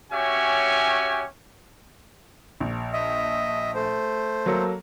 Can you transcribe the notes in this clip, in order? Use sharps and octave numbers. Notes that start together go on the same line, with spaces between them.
C#4 F#4 G4 C#5 E5 G#5
A#1
D#5 E5
A3 C5
F#3 A#3 A4